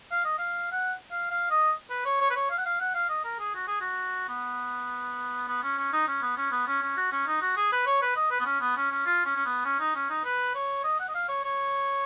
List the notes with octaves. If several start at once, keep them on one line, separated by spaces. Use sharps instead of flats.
F5
D#5
F5
F#5
F5
F5
D#5
B4
C#5
C#5
B4
C#5
F5
F#5
F5
F#5
F5
D#5
A#4
G#4
F#4
G#4
F#4
B3
B3
C#4
C#4
D#4
C#4
B3
C#4
B3
C#4
C#4
F#4
C#4
D#4
F#4
G#4
B4
C#5
B4
D#5
B4
B3
C#4
B3
C#4
C#4
F4
C#4
C#4
B3
C#4
D#4
C#4
D#4
B4
C#5
D#5
F#5
D#5
F5
C#5
C#5